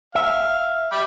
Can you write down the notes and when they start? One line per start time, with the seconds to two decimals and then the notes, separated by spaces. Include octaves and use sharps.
0.15 E5 F5
0.92 G5 B5 D6